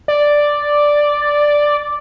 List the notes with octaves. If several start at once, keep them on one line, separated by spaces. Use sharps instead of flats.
D5